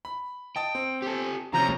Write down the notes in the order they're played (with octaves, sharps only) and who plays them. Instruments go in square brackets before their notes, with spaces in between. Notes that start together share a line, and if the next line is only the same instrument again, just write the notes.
[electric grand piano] B5
[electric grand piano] D#5 A5 D#6 [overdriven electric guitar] G5
[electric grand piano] C4
[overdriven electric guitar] G4 A4
[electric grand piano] C3 G6 A#6 [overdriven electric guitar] F3 C#4 [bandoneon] A#5